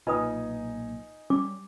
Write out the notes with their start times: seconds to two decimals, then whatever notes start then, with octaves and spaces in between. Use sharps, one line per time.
0.07 B1 A#2 D#4 F4 B4 G#5 D#6
1.30 G3 C#4 D6